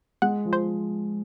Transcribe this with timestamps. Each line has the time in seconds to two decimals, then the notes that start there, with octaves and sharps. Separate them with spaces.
0.22 G#3 F#5
0.45 F3
0.53 C5